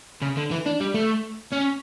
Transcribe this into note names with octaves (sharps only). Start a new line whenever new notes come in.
C#3
D3
E3
D4
G3
A3
C#4